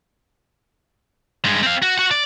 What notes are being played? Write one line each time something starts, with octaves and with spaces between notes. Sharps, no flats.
G2 G#3
C4 F5
F#4
F#4 F#5
D5